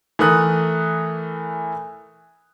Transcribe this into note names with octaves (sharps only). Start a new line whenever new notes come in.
E3 A3 A#4 D#6 F#6